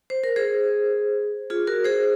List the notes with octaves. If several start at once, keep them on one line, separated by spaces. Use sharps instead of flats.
C5
A#4
G#4 C5
F4 G#4
F#4 A#4
G#4 C5